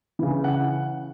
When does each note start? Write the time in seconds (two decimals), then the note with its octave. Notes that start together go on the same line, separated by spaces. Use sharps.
0.19 C#3 E3
0.44 F#5